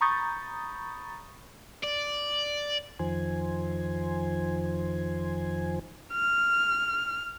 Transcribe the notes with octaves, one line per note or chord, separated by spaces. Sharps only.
A#5 B5 C#6 D#6 G6 A6
D5
F2 D#3 F3 C5 G#5
F6